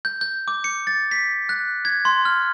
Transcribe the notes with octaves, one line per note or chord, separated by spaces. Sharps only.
G6
G6
D6
C#7
A6
B6
F#6
G#6
C6
F6